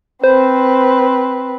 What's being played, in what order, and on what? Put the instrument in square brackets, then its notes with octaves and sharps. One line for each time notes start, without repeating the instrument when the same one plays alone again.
[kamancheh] C4 B4 [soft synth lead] C5